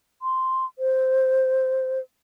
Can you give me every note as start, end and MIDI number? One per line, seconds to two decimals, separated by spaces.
0.22 0.65 84
0.79 1.99 72